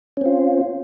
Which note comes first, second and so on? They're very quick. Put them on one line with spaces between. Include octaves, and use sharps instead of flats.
C#4 C4 F4